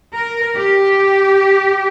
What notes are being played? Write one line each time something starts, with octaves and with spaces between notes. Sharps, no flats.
A#4
G4